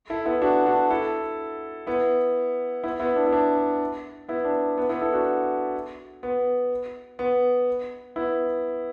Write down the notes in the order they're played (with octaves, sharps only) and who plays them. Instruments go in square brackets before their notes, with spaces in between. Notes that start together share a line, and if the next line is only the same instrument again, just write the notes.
[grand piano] E4 A4
B3 E4
D4 F#4
D4 F#4
E4 A4
B3 E4
B3 E4
B3 E4
D4
E4
D4
B3 E4
D4
B3
B3 E4
E4 A4
D4 F#4
B3
B3
B3 E4